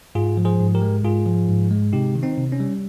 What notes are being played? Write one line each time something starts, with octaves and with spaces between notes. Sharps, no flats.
G#2 F4 G#4
F3
G#4 C5
G#2
G4 A#4
G#3
G#2 F4 G#4
F3
G#2
G#3
C3 D#4 G4
D#3
C4 D#4
C3
C#4
G3